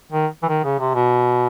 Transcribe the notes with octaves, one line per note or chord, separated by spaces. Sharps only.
D#3
E3
D#3
C#3
C3
B2